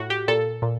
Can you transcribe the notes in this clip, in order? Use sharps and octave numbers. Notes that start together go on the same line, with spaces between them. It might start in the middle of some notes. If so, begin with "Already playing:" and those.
Already playing: A2 F#4
G4
A#2 A4
A#2